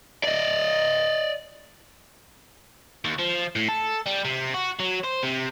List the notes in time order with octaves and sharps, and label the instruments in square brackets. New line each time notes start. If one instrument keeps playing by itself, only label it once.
[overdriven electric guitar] D5 D#5
D#2
F3
A2
A4
G3
C3
F#4
F#3
C5
C3